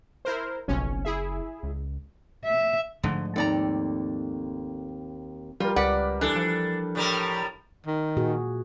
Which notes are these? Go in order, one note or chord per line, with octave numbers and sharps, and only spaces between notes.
E4 A#4 C5
F#1 B1 F2 C#4
E4 G#4 E5
C#2
E5
G#2 D3 F3 A3
D#2 C4 A4 D5 A#5
G3 F4 A#4
C#2 B4 D5 F#5
E3 D4 A4
F3
A2 G3 A#4
D#3
A#2 F#4 G#4